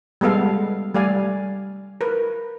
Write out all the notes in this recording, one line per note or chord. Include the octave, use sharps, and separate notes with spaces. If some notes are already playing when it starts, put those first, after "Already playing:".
G3 G#3 B3 A4 F5
G3 A3 D5 F5 G#5
A#4 B4